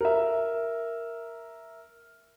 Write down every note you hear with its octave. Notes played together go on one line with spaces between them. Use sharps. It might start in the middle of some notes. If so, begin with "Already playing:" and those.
A#4 E5